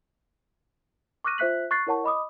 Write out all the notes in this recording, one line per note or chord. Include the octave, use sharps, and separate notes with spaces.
C#6 D6 F6 F#6 A#6 D#7
F4 C5 E5 F#6 B6 F#7
C#6 F#6 A6 C7
E4 A#4 C#5 F#5 A5 C#6
D#5 B5 D6 D#6